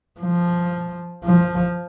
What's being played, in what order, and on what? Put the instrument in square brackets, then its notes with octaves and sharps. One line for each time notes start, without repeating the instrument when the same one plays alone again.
[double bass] F3
F3